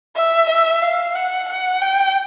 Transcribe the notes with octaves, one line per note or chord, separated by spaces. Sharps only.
E5
E5
F5
F#5
F#5
G5